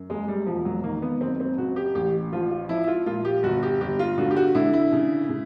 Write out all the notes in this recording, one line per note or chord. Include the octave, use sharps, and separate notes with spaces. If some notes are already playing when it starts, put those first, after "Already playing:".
Already playing: F#2
F#1 G#3
G3
E1 F3
F#3
D#3 A#3
B3
F#1 C4
C4
C#3 F#4
G4
A1 G4
F3 F4
F4
F3 E4
E4
F4
A#2 F4
G4
G1 F#4
G4
G1 G4
F4
D3 F#4
G4
F#4
D3 E4
E4
C#3
C#3